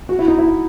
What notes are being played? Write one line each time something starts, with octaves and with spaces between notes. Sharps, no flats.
F#4
E4
D#4
E4